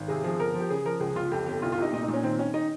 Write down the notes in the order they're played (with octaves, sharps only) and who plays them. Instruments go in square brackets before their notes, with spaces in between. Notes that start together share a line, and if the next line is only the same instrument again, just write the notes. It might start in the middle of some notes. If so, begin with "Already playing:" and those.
Already playing: [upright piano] G#1
C3 G#4
F3 G#4
G1 A#4
F3
G4
C#3 G#4
F3 A#4
C#2 G#4
C#2 F4
F2 G4
G1 G4
C2 F4
F4
C3 D#4
A#2 D#4
D#4
A#2
C#4
D#3 C4
D#3 C#4
D#4